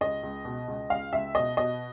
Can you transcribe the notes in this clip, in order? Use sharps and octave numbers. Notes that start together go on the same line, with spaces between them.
C#2 D#5
C#2
B2
C#2
C#2 F5
C#2 E5
B2 D#5
B2 D#5